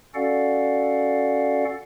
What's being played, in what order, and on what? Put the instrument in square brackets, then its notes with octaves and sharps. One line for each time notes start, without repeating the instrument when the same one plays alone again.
[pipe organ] C#4 F#4 A4 D5 F5 F#5